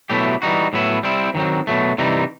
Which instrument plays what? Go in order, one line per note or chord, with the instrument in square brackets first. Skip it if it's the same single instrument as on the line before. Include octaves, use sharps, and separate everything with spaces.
[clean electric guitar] B2 F#3 A3 E4 G4
E3 G3 D#4 F#4
A2 F#3 B3 E4
G3 C4 E4
D#3 F#3 C4
B2 F#3 A3
C3 E3 G3 D#4